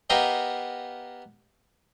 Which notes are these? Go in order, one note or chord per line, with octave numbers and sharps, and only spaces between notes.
B3 G4 A#4 D#5 F5 G5